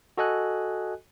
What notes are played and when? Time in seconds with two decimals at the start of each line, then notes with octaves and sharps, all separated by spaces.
0.18 F#4 A4 D#5 G#5 F#6